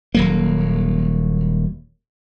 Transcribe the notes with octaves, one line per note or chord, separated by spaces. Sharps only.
D#1 F#3 A#3